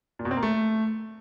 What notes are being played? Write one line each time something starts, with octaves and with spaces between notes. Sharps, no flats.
A#2
B2
C4
A#3
A3